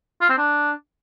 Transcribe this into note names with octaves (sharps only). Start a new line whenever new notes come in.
F4
C4
D4